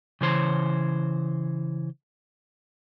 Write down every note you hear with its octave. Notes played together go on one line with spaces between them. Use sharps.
C#3 E3 C5 C#5